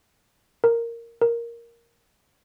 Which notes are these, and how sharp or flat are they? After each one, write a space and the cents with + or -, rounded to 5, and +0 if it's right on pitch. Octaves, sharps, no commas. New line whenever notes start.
A#4 -5
A#4 +5